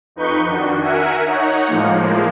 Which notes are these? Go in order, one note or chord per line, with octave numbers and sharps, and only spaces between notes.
F2 D#4 B4 C#6 G6
D#3 D4 F#4
A#4 E5 F#5 G#5
D#4 C#5 F#5
A2 F3 G#3 A#3